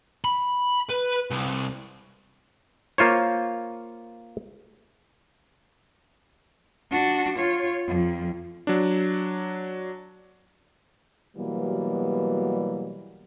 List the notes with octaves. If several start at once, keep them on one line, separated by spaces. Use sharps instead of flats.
B5
B4
C2
A#3 F4 C5 C#5
D4 F#4
F4 C#5
F2
F#3 D4
B2 E3 F#3 G3 A#3 B3